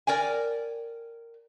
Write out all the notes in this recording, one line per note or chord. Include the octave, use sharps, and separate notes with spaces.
A#4 D5 G5 G#5